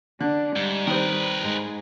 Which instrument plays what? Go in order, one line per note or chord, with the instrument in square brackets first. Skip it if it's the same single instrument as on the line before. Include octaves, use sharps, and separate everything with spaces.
[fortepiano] D3 [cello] D4
[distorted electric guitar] G#2 [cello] G3
[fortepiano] D#3 C4 [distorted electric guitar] A#4 B4
[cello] G#2 G#3